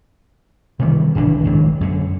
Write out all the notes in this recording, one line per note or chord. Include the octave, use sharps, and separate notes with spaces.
C3 D#3 E3 G3
D1 G#1 E3 D4
G#1 C#2 D#3 F#3
F#2 D3